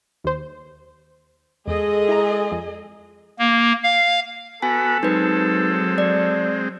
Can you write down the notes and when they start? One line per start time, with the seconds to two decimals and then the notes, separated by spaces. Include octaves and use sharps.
0.24 D#2 C5
1.67 E2 G#3 G#4 A4 D#5
2.09 E4 A#5
2.52 F2
3.39 A#3
3.84 F5
4.62 B3 F#4 A4 G#5 B5
5.03 F#3 G#3 C4 D#4 B4
5.98 D5